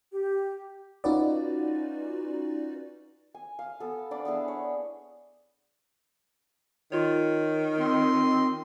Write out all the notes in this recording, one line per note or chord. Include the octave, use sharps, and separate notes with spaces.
G4
C#4 D#4 F4 F#4 B4 D5
G#5
F5
B3 A4
D4 D5 B5
B3 D4 E4 G#4
C#5
D#3 F4 C#5
C4 D#5 C6